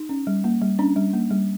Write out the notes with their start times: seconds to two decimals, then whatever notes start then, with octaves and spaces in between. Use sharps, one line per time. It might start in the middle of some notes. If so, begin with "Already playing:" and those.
Already playing: D#4
0.09 C#4
0.27 G3
0.44 A#3
0.62 G3
0.79 C#4 D4
0.96 G3
1.13 A#3
1.31 G3